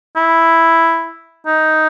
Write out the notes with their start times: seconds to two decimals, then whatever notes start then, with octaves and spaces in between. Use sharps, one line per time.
0.16 E4
1.47 D#4